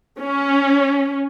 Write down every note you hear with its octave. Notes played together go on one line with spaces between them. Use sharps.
C#4